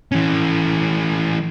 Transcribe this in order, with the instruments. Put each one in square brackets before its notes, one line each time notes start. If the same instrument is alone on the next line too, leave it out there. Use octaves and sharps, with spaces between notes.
[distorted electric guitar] E3 C#4